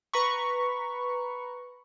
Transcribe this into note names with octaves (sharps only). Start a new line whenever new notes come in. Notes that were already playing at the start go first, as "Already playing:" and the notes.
B4 A#5 B5 C#6